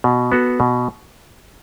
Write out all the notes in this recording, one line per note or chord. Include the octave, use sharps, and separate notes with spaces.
B2
B3 F#4 A4
B2